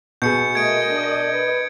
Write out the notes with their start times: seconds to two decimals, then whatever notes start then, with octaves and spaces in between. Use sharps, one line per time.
0.22 B2 G#4 G6 C#7
0.55 A3 A#4 D#5 G#6 D7
0.89 D4
1.33 B4